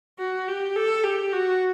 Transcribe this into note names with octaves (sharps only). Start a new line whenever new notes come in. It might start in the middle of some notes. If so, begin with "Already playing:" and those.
F#4
G4
A4
G4
F#4